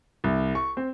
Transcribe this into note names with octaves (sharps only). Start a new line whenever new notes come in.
C2
C#6
C4